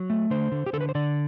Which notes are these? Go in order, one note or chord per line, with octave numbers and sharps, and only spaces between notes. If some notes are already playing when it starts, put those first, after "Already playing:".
Already playing: F#3
A3
D3 C5
D3
G4
D3 A4
B4
C5
D3 D5